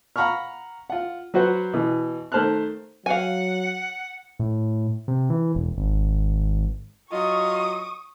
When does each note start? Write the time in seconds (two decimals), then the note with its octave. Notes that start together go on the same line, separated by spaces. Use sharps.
0.16 F5 F#5 A#5 B5 C#6 F6
0.90 F4 F#5
1.34 F#3 F#4 B4 C5 F#5
1.74 B2 E3
2.32 D#3 A3 C5 A5 F6 F#6
3.06 F#3 F5 F#5 G#5
4.39 A2
5.08 C3
5.30 E3
5.55 E1
5.77 G#1
7.11 F#3 F4 D#5 C#6 D#6